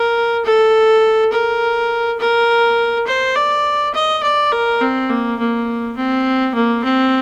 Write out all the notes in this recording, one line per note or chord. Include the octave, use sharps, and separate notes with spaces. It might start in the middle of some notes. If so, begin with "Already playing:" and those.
Already playing: A#4
A4
A#4
A#4
C5
D5
D#5
D5
A#4
C4
A#3
A#3
C4
A#3
C4